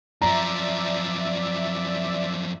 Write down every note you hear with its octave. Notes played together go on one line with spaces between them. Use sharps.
F#2 F3 D5 E5 A#5